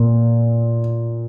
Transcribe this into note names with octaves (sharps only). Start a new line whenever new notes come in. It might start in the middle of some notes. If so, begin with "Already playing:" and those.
Already playing: A#2